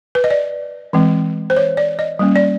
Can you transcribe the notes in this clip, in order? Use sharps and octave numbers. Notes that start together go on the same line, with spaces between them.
B4
D#5
D5
E3 G#3 C4
C5
C#5
D5
D#5
G3 A#3 C#4
D5